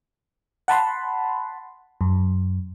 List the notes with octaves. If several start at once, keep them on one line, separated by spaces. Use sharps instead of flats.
F#5 A5 B5 C6
F#2